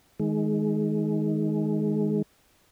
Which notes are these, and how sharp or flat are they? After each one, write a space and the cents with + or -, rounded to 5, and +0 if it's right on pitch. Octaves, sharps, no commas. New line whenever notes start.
D#3 +15 G#3 +20